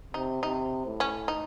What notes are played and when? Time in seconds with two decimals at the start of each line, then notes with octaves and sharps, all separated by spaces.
0.14 C3 D#4
0.43 C3 D#4
0.86 A2
1.00 C#4
1.28 D#4